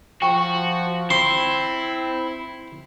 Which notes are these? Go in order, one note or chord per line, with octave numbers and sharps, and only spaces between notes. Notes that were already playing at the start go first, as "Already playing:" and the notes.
F3 F#4 G5 C#6
C4 E4 C6